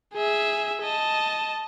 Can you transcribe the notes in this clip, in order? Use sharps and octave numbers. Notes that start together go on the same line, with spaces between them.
G#4 E5
D#5 A5